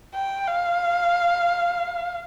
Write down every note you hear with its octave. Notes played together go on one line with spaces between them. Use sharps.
G5
F5